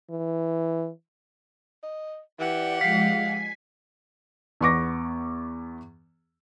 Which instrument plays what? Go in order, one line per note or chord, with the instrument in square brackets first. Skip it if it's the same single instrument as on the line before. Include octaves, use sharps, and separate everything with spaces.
[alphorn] E3
[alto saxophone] D#5
[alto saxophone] E3 [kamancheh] G4 F#5 [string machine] D5
[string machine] F3 G#3 D#5 [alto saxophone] F5 [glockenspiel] B6 C7
[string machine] G#5
[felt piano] E2 B3 C#6 D6 A#6